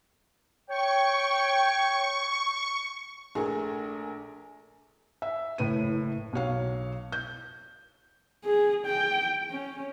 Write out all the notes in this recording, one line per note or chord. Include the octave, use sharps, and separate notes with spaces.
C#5 G5 C#6
A#1 A3 G#4 A#4
E5
F#1 A2 B4 D#7
B1 F#3 C#5 F5
G6
G#4
G5
C#4